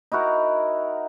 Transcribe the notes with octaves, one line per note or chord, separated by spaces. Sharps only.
D#4 E4 F#4 A#4